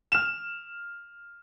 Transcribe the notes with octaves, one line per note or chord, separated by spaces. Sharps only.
F6 E7